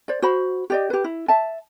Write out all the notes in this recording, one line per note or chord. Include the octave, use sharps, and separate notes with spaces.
C5 D5
F#4 C5 B5
G4 D5 D#5
G4 B4
E4
E5 A5